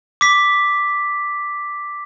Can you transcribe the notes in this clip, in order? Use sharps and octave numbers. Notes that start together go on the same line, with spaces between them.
D6 B6